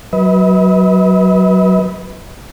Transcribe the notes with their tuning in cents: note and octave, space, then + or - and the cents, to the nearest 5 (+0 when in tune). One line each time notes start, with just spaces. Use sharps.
F#3 +10 B4 -5 D#5 +45